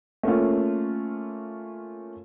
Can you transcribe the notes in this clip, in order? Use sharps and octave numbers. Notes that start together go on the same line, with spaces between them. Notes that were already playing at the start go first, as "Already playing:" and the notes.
A3 A#3 C#4 F4